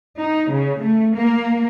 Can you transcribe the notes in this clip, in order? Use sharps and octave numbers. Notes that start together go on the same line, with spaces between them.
D#4
C#3
A3
A#3